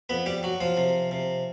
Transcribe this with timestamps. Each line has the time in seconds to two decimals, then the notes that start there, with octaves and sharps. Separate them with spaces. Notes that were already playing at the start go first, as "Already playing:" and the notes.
0.09 F2 B3 B4
0.26 G3 G4
0.43 F#3 F#4
0.61 F3 F4
0.77 C3
1.11 C3